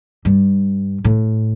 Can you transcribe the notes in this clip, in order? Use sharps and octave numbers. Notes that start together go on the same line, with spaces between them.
G2
A2